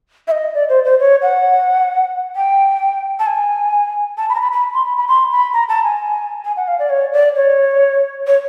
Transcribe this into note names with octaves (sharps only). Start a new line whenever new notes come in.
E5
D#5
D5
C5
C5
C#5
F#5
G5
A5
G#5
A5
B5
A#5
B5
B5
C6
B5
B5
C6
B5
A#5
A5
G#5
G#5
F#5
F5
D5
C#5
D5
C#5
C#5